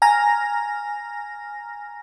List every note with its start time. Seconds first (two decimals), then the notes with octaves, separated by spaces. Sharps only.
0.02 G#5 A#5 F6 A#6